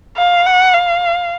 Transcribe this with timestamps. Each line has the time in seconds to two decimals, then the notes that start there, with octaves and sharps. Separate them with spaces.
0.17 F5
0.46 F#5
0.74 F5